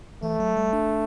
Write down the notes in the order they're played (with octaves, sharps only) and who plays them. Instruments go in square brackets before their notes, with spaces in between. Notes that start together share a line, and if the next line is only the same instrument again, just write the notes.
[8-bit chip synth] E3 [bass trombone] A3
[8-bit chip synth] F#3
G3
D4